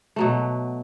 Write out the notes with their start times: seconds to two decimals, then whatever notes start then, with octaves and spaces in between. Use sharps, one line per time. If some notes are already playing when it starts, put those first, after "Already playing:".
0.16 B2 F#3 A3